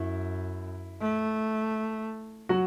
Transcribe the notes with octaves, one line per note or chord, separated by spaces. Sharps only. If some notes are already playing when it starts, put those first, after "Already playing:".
Already playing: F#2 E4
A3
F#3 F#4